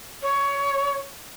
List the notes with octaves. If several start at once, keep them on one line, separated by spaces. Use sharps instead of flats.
C#5